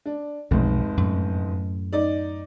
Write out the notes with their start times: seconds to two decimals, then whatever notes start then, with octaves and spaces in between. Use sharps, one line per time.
0.06 D4
0.51 F1 B1 G#2 F3
0.97 F#2 A2
1.93 D#4 D5